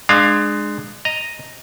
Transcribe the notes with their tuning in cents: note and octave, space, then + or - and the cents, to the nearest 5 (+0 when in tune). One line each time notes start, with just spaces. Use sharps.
G#3 +0 D4 +30 F5 +0
D#5 +0 A#5 +0